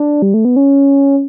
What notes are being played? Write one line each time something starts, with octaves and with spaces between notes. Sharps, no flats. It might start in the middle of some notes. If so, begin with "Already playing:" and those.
Already playing: D4
G3
A3
B3
C#4